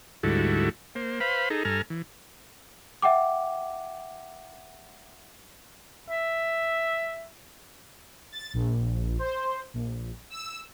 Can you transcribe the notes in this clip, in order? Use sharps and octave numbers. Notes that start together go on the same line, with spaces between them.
D2 G#2 G3 E4 F#4 A4
A#3 C5
B4 C5 F5 B5
D#4 G#4 A4 A#5
G2 A4 G#5 A#5 F6
E3
E5 F#5 G5 D6
E5
A6
A#1
C5
A#1
E6